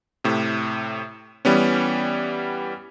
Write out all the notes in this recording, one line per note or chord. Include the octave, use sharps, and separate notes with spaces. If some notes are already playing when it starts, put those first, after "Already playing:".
A2 C3
E3 G3 B3 C#4